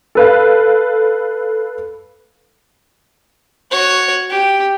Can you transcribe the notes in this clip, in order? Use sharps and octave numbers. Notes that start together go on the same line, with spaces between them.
A4 B4 F5
F#4 C#5
G4